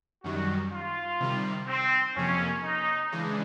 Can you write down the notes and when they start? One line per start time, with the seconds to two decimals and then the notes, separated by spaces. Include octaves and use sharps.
0.24 F#2 D#3 G3 F#4
0.72 F4
1.20 C3 D#3 G3
1.67 C4
2.16 F2 C3 F3 A#3 C#4
2.64 D#4
3.12 C#3 E3 G#3 D4